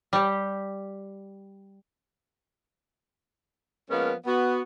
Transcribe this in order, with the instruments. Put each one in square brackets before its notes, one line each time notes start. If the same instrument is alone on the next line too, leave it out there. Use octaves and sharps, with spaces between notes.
[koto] G3 G4
[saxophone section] F3 G#3 A#3 B3 C#4 A#4
B3 F#4